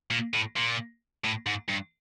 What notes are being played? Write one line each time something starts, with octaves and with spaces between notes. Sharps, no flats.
A#2
A2
A#2
A2
G#2
G2